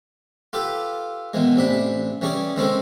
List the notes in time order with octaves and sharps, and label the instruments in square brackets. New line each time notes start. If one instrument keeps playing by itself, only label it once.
[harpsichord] F4 G4 A4 B4
B2 D#3 E3 G#3
A1 C3 D4 B5
E3 G3 C#4 G#4 D5
D#3 G#3 C4 C#4 G#4 A4